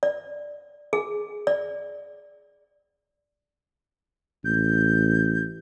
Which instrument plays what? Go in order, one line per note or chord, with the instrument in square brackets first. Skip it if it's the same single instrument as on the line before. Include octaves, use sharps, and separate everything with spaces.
[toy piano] D5
G#4
D5
[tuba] A1 [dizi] G6